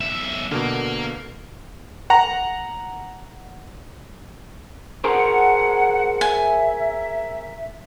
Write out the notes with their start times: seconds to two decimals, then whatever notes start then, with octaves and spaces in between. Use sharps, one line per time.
0.01 B1 E5
0.52 B2 D3 A#3
2.10 F#5 A#5
5.04 G#4 A#4 C5 F#5
6.21 E5 G#5